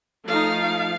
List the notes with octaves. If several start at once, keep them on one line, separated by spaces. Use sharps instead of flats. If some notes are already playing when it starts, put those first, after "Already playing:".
F3 A3 D#4 F5